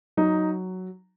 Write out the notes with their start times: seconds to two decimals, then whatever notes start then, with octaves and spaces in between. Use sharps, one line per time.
0.17 F#3 D#4